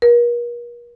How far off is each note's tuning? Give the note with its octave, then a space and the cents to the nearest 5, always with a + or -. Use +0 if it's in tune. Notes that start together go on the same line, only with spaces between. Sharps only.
A#4 +40